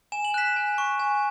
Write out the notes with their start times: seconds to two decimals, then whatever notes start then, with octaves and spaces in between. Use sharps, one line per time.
0.12 G#5 E7
0.25 F#7
0.34 F#6 B6 E7
0.56 G#5
0.78 C#6
1.00 G#5